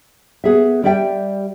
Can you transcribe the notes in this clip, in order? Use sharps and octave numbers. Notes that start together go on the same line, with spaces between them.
B3 G#4 E5
G3 G4 D5 E5 F5 G5